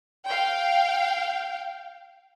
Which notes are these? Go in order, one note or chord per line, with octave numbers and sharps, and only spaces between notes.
F5 G5